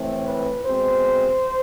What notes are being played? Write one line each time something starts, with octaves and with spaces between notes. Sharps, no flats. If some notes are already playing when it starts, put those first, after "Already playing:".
Already playing: A2 E3 A3 C4
B4
B2 G#3 C4 C5